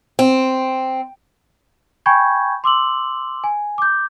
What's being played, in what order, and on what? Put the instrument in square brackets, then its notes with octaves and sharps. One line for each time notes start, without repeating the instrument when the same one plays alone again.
[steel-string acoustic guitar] C4
[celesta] G5 G#5 B5 C#6 G6 G#6
C6 D6 E6 F#7
G#5
D6 G6